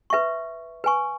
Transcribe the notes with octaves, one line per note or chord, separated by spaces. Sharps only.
B4 E5 C#6
B4 G#5 C#6